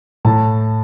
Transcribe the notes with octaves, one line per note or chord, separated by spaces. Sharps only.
A2 A5